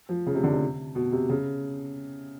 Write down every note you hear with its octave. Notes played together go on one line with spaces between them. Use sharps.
F3
C#3
C3
D3
C3
B2
C3
C#3